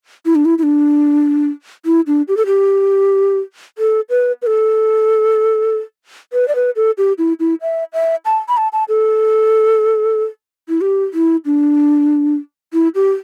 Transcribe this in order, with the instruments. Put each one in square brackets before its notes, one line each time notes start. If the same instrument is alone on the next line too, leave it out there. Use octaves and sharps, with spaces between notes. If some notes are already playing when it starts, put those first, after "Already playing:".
[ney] E4
D4
E4
E4
D4
E4
D4
G4
A4
G4
A4
B4
B4
A4
B4
D5
B4
A4
G4
E4
E4
E5
E5
A5
B5
A5
A5
A4
E4
G4
E4
D4
E4
G4